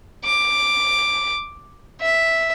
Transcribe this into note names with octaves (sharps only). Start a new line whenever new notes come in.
D6
E5